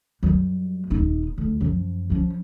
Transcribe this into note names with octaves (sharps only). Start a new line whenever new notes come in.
F#2 G3
D#1 D#4
D2
F#2 F3
F3 C#4